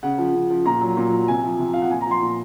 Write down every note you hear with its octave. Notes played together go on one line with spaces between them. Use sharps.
C#3 F#5
F3
C#3
F3
A#2 A#5
F#3
A#2
F#3
C3 G#5
F3
C3
F3 F5
F#5
A#2 G#5
A#5
F3 C6
A#2